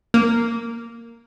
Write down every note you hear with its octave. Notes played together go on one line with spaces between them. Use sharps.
A#3